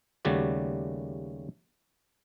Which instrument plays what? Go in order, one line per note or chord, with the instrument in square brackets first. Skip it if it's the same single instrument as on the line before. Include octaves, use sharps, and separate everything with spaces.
[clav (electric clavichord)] D#2 C#3 G3 A3 F#4 D5